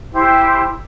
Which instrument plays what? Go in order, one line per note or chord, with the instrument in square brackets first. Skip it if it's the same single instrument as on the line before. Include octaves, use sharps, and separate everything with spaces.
[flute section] E4 G4 C5